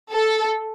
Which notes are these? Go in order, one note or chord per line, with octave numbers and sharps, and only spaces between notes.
A4